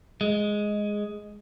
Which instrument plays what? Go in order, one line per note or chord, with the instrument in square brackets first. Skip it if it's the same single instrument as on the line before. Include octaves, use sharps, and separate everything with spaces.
[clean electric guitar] G#3